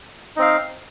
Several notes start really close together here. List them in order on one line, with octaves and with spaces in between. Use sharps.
D#4 C4 F5